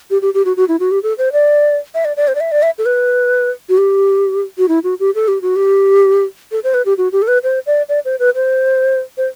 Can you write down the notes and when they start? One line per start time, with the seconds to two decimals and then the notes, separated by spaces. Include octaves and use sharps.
0.11 G4
0.22 G4
0.34 G4
0.45 F#4
0.57 F#4
0.68 E4
0.80 F#4
0.91 G4
1.03 A4
1.18 C5
1.33 D5
1.95 E5
2.05 D5
2.17 D5
2.28 C5
2.35 D5
2.40 E5
2.52 D5
2.62 E5
2.78 A4
2.86 B4
3.69 F#4
3.77 G4
4.58 F#4
4.68 E4
4.84 F#4
5.00 G4
5.15 A4
5.28 G4
5.42 F#4
5.56 G4
6.52 A4
6.64 C5
6.74 B4
6.86 G4
6.98 F#4
7.12 G4
7.22 A4
7.28 B4
7.43 C5
7.66 D5
7.89 D5
8.05 C5
8.19 B4
8.35 C5
9.17 C5